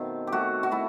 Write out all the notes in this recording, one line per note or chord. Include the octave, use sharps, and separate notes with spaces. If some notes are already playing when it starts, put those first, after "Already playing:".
Already playing: B2 D#3 A3 C4
G4
A3 F#4
F#4
A3 E4